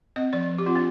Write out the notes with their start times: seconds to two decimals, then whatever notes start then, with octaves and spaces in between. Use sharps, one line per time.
0.16 C4 D#5
0.33 F3 D5
0.50 F3
0.58 G4
0.66 C4 F4
0.75 D4